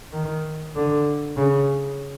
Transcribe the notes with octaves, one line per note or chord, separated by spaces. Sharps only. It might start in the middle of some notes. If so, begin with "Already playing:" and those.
D#3
D3
C#3